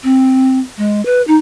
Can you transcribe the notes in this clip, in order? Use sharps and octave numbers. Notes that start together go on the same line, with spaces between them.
C4
G#3
B4
D#4